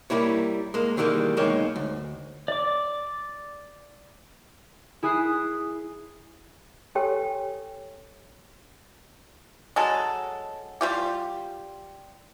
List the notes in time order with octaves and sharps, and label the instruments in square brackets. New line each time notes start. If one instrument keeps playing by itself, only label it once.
[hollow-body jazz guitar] G3 A#3 E4 C#5
G#3 A#3
D#3 E3 G3 G#3 A#3
B1 G#3 A#3 D#4 C#5 G5
D2
[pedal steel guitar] D5 D6
[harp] E4 G#4 D#6 F#6 C7
[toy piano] G4 A4 C#5 G5 G#5 C6
[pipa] F#3 G#3 A4
G3 F4 G4